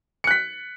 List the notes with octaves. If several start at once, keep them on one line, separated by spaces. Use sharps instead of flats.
F#6 B6 C#7